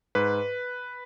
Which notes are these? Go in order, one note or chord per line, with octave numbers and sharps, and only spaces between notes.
G#2 B4